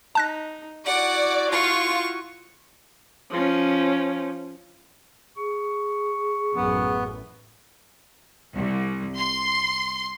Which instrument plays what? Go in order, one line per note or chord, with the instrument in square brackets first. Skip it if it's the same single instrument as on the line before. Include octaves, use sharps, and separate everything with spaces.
[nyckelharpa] D#4 [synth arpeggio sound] A5 F#6 A#6
[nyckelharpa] E4 F#4 [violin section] D5 [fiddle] F#5
[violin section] F4 [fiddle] C#6
[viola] F3 C#4
[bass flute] G#4 [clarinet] C#6
[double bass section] A1 F#2 [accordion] B3
[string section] C2
C6